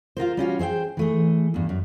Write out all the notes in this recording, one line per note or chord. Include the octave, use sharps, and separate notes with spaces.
F4 F#4 A#4 C5
G3 C#4 F4 F#4
G#4 C5 E5 G5
E3 A3 G#4
E2 G2
F#2